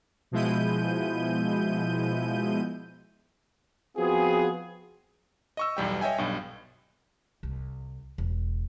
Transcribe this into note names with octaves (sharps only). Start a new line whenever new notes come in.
B2 F3 G#3 E4 G6 D#7
F3 B3 C4 F4 F#4 G#4
D#5 C#6 E6
B1 E2 G3 G5
C#5 D#5 E5 G5 G#5
B1 G2
C2
E1